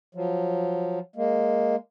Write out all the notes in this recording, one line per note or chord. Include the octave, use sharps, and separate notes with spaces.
F3 F#3
G#3 A#3